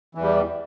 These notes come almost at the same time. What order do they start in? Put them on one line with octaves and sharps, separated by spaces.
E3 E2 G3